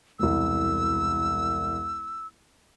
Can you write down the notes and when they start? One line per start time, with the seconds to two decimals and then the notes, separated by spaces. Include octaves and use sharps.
0.19 E1 C2 E6